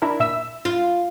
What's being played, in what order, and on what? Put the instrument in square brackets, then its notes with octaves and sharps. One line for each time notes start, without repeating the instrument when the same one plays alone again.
[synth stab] D4 E4 A#4
A#2 E5 E6
[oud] F4